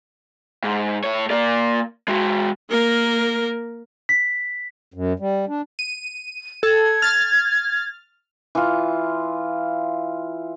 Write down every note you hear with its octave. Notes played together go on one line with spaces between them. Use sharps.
G#2
A2 C#5
A#3 D5
G#3 F#4
A#3 A#4
B6
F#2
G3
D4
D#7
A4 G#6
F6 A6
E3 F4